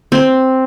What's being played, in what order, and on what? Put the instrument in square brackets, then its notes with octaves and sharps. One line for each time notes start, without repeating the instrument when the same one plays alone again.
[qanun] C4